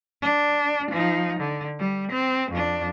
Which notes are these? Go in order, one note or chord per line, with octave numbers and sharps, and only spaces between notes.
D4
F3 D#4
D3
G3
C4
F2 D4